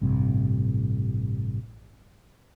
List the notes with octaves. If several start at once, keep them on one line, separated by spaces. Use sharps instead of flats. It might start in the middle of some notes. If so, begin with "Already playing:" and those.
A1 G2 C3